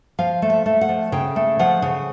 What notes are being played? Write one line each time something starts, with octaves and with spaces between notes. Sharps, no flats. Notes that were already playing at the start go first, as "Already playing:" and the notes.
F3 F5
A3
E5
A3
F#5
F3
C#3 G5
A3
F3 F#5
C#3